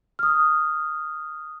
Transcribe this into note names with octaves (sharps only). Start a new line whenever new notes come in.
D#6 F6